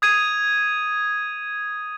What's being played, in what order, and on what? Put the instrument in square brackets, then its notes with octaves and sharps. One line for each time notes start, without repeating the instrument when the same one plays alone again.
[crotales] D#6 G#6 D#7